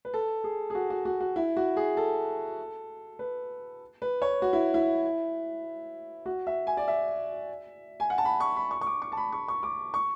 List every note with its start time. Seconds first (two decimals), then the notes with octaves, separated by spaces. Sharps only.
0.05 B4
0.14 A4
0.44 G#4
0.70 G#4
0.75 F#4
0.90 F#4
1.05 F#4
1.21 F#4
1.36 E4
1.57 F#4
1.77 G#4
1.97 A4
3.19 B4
4.02 B4
4.22 C#5
4.42 F#4
4.53 E4
4.74 E4
6.26 F#4
6.47 E5
6.67 G#5
6.77 D5
6.88 E5
8.00 G#5
8.10 F#5
8.18 A5
8.25 B5
8.40 C#6
8.56 B5
8.71 C#6
8.81 C#6
8.86 D6
9.02 C#6
9.12 A5
9.17 B5
9.32 C#6
9.48 C#6
9.63 D6
9.94 C#6